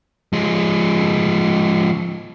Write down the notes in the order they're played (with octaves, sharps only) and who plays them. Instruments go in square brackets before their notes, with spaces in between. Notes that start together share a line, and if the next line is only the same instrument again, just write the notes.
[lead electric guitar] F3 G#3